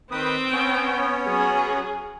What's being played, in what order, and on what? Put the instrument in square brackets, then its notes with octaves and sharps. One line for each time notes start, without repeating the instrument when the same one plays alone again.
[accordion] D#3 B4 D#6 [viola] C4 G5
[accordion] B3 C#4 C#5
[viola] F#3 G#4